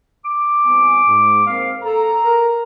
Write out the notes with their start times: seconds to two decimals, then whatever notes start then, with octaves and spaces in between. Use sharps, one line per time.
0.25 D6
0.65 C2 B3 G#5
1.07 G#2
1.46 A#3 C4 F5
1.83 A4 A#5
2.24 A#4